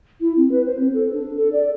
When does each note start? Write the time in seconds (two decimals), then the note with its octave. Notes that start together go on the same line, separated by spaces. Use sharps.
0.21 E4
0.37 C4
0.51 B4
0.66 C5
0.80 C4
0.94 A4
1.13 D4
1.37 A4
1.53 D5